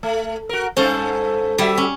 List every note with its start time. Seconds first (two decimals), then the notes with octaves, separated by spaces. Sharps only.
0.03 A3
0.49 F#4 A#4
0.77 G2 C#4 A4 C5
1.58 G3 F#4 E5
1.77 C#4